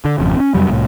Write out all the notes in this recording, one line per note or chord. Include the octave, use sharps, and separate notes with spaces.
D3
G#1 F2 C#3
C4 C#4
F2 C3 F#3 G3
C2 A2